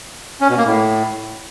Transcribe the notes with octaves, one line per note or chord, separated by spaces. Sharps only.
C#4
B2
A#3
A2